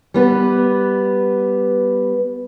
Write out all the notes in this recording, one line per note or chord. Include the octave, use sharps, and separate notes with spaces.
G3 B3 B4